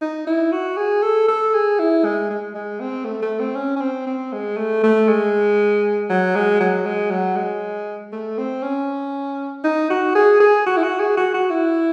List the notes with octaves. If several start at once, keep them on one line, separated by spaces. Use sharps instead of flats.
D#4
E4
F#4
G#4
A4
A4
G#4
E4
G#3
G#3
G#3
C4
A3
A3
C4
C#4
C#4
C4
C4
G#3
A3
A3
G#3
F#3
G#3
F#3
G#3
F#3
G#3
A3
C4
C#4
D#4
F#4
G#4
G#4
F#4
E4
F#4
G#4
F#4
F#4
E4